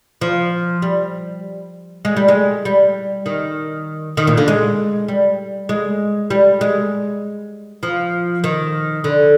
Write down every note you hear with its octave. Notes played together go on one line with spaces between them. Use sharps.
F3
G3
G#3
G3
G#3
G3
D#3
D#3
A#2
D3
G#3
G3
G#3
G3
G#3
F3
D#3
D3